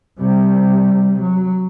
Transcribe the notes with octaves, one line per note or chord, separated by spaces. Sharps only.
C3 G3
F#3